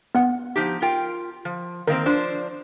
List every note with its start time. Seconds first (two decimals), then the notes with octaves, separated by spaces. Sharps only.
0.15 B3 F#5
0.56 F3 D#4 G4
0.82 F4 A#4 G5
1.45 F3
1.87 D#3 A#3 C4 A#4
2.06 F3 D4 C5